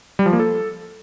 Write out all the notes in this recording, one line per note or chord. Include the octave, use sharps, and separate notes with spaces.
G3
F3
A#3
A4